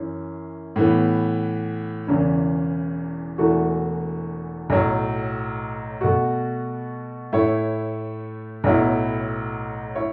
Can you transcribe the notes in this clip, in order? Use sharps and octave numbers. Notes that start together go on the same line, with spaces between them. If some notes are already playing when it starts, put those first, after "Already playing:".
Already playing: F#2 E3 C#4
A2 E3 B3
E1 E2 C#3 E3
E1 E2 E3 A3 F#4
B1 A2 F#3
B2 A3 F#4
A2 A3 E4 C#5
B1 A2 F#3 B3 E4
E4 C#5